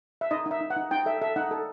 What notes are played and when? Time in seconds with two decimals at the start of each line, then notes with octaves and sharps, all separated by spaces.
0.21 E5
0.31 D#4 D#5
0.46 D#4
0.51 E5
0.60 D#4
0.70 F#5
0.76 D#4
0.91 D#4 G5
1.06 A4 E5
1.21 A4 E5
1.36 D#4 F#5
1.51 A4